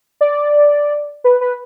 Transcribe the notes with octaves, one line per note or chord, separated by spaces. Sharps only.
D5
B4
B4